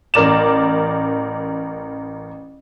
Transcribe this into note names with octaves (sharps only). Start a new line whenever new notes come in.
A1 A#4 D5 E7